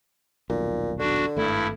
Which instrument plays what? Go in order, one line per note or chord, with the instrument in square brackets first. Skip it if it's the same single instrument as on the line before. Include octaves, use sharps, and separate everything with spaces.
[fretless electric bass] D#1 B1 [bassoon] A#2
[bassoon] D3 [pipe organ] D4 F#4
[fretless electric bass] G#1 A3 [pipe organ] G2 E4